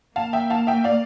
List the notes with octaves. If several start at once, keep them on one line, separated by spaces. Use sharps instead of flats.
A#3 F5 A5
E5 G5
F5 A5
E5 G5
D5 F5